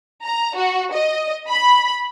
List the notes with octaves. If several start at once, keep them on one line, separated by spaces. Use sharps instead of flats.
A#5
F#4
D#5
B5